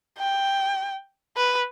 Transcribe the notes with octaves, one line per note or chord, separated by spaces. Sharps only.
G5
B4